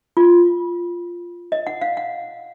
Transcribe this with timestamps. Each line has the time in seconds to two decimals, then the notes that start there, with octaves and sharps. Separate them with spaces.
0.17 F4
1.52 D#5
1.67 F#5
1.81 F5
1.97 F#5